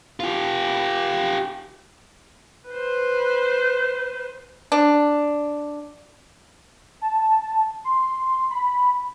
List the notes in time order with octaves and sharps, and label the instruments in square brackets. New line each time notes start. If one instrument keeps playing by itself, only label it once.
[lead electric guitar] F4 G4
[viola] B4 C5
[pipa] D4
[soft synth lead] A5
C6
B5